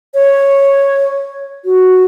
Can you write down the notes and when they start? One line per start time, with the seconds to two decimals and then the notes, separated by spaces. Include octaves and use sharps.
0.14 C#5
1.65 F#4